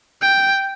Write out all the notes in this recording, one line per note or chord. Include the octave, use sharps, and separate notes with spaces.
G5